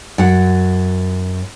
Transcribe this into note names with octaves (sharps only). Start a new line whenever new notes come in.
F#2 F#5